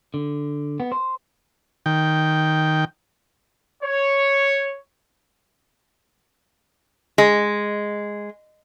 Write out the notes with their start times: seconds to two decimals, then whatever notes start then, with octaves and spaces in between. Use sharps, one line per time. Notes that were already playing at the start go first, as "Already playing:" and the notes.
0.14 D3
0.80 B3
0.92 C5
1.86 D#3 G5
3.83 C#5
7.18 G#3